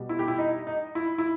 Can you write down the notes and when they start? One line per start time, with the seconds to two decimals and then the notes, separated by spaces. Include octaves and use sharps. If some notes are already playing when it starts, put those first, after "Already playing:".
Already playing: B2 G3
0.09 E4
0.19 G4
0.28 E4
0.38 D#4
0.67 D#4
0.95 E4
1.18 E4